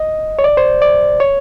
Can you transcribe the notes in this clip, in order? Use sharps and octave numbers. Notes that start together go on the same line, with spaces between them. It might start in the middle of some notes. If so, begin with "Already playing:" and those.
Already playing: D#5
C#5
D5
C5
D5
C#5